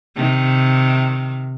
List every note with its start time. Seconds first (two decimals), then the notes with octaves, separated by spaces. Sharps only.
0.15 C3 D#3